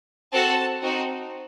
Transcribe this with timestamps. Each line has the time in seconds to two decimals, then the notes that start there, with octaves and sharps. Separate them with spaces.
0.33 C4 F#4 A4 A5
0.81 C4 D#4 F#4